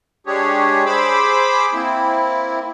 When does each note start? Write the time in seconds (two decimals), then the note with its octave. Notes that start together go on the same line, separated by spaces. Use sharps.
0.27 G#3 D4 G4 G#4 C#5
0.86 G#4 C5 B5 D6 E6
1.73 A#3 C4 E4